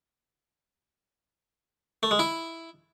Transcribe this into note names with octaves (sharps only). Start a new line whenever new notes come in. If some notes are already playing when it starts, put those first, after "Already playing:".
A3
G#3
E4